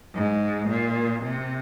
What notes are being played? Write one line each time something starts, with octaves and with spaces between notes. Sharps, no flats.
G#2
A#2
C3